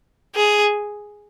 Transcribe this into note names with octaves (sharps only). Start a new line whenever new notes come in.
G#4